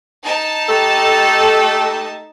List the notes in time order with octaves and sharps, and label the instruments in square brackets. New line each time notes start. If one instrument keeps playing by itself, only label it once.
[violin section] D#4 A5
[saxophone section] A3 G4 A4